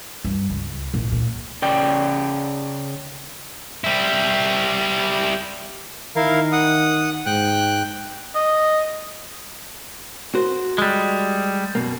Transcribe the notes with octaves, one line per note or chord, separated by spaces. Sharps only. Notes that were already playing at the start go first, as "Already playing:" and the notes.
G2
C#2
A#1
A#2
C#3 D5 G5
G3 E4
D#3 E4 A#4 F5
F#5 D#6
G#2 G5 F#6
D#5
F#4 A#4 C5
G3 G#3
F#2 B2 A#3